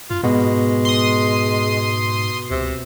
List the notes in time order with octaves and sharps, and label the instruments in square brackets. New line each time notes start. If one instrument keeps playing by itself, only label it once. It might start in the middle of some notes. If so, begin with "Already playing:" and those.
[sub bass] F#2 [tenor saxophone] F4
[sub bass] G#2 [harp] B2 [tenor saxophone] G#3
[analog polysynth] C6 D#6
[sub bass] C#2 [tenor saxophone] C3